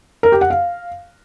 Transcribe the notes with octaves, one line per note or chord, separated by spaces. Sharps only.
A#4
G4
F#5
F5